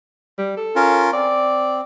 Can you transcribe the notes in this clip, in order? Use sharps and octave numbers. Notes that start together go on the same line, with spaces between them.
G3
A4
C#4 F4 A#4
C4 D5